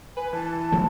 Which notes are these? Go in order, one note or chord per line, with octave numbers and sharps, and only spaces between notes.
B4 G#5
E3 A5
F3 F#3 A3